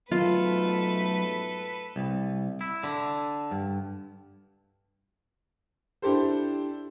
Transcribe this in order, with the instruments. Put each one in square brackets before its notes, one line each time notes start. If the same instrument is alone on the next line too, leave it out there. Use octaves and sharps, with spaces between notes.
[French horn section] G#2 B2 A3 [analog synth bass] F#3 [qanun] F4 [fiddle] A4 B4
[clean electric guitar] C2
E4
D3
G2
[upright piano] D4 E4 G4 A4 C5